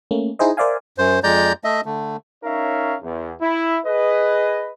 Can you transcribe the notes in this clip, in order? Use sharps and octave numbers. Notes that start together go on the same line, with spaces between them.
A3 A#3 C#4
D#4 E4 G#4 C5 D#5
A#4 C5 D5 E5 F5 G#5
F#2 C5
F2 G#3 D5 A#5 G6
A3 D#5 E5
D3 A3
C#4 D#4 A#4 C#5 E5 F5
E2
E4
G#4 B4 D#5